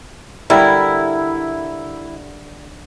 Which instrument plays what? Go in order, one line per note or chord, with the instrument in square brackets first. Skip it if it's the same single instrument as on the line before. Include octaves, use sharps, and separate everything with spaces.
[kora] D3 G3 A#4 [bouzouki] E4